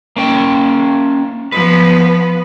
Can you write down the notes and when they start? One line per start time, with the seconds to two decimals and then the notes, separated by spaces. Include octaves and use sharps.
0.16 A#3 C#4 G5
1.52 F3 B3 B4